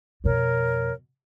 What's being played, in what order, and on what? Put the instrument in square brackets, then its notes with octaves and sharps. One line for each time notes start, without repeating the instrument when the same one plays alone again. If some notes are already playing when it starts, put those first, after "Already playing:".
[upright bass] F2 B2 [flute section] A#4 C#5